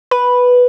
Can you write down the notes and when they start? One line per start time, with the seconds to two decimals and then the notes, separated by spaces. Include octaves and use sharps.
0.11 B4